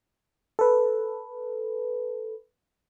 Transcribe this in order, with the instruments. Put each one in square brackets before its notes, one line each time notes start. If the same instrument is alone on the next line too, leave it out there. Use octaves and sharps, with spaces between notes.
[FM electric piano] A4 B4